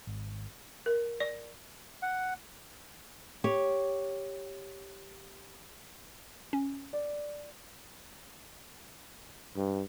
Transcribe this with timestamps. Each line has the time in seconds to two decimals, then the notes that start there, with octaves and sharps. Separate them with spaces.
0.07 G#1
0.86 A#4
1.20 D5
2.02 F#5
3.44 G4 C#5
6.53 C#4
6.93 D5
9.56 G2